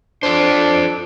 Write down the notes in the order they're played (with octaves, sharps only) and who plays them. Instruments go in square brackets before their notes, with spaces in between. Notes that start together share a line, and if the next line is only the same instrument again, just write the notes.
[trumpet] D4 [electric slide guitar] F4 A4 C5